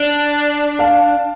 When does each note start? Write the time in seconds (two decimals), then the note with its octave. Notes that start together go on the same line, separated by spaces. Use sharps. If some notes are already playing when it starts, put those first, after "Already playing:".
Already playing: D4
0.79 F5 A5